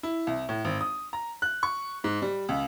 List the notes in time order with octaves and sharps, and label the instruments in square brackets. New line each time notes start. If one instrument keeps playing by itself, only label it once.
[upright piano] E4
C2
A2
G#1
D#6
A#5
F#6
C#6
G#2
G3
C#2